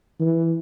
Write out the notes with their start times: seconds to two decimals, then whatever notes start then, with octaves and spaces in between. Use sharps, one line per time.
0.20 E3